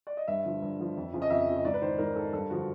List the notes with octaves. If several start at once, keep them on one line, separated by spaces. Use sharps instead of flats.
D5
D#5
G2 E5
D3 F3
G2
D3 F3
F2
C#3 F3
D#5
F2 E5
C#3 F3
D#5
G#2 D5
B4
D#3 C5
G#2 A#4
D#3 A4
G2 A4
D3 F3 F#4